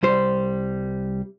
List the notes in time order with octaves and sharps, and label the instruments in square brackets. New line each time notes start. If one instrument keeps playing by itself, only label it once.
[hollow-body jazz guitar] C2 G3 C5